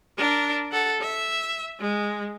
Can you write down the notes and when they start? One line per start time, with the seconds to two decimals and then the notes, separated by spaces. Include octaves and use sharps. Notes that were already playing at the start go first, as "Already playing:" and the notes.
0.18 D4 A#4
0.71 A4 F#5
1.01 E5
1.80 G#3